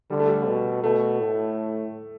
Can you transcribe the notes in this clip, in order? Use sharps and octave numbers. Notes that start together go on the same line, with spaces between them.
D3 G3
A3
G3
B2
B2 A3
A2